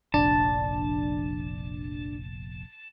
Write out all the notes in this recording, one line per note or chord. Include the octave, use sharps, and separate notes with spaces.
F1 A#1 D4 A5